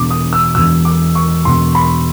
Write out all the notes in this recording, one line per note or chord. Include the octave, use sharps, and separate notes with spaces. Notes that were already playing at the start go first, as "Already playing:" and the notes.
Already playing: E1 E2 B2 D6
D#6
E6
E1 E2 B2 E6
D6
C#6
E1 E2 B2 C6
B5